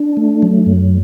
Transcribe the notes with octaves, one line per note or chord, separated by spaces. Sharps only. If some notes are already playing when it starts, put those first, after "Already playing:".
Already playing: D4
A3
F#3
F#2